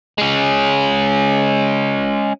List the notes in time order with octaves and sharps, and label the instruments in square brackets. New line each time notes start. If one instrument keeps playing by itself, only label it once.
[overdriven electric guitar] G#3 C#4